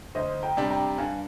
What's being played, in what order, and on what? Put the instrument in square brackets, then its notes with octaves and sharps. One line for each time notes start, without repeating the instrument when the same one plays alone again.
[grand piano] D2 [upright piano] C5 D#5
[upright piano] G5 A#5
[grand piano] C3 G3 D4 G4
[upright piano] G5 A#5
[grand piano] G2 [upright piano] F5 G#5